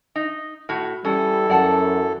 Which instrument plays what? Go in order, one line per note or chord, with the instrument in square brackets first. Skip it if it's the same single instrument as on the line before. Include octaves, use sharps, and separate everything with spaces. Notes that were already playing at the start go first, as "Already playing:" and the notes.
[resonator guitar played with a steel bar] D#4
A2 F#4
[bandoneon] E3 A4 [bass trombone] G3 [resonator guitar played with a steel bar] C#4
[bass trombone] F#2 [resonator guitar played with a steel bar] D5 F#5 A5